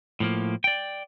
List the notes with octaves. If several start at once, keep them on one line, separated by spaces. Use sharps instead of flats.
A2 F3 A#3
D5 G5